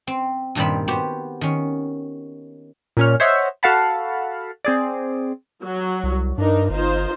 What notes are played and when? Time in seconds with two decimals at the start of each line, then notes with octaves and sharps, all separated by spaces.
0.07 C4
0.55 G2 A#2 D#3 G3 C4 B5
0.88 B3 F#4 G4 C5
1.41 D#3 C#4
2.97 A#2 C#4 F6
3.20 C5 C#5 D#5 E5 F#5
3.63 F#4 A4 F5 F#5 A5 B5
4.65 C4 G#4 D5
5.63 F#3
6.03 C2
6.38 G2 D4 D#4 A#4
6.70 G1 D#4 F4 C5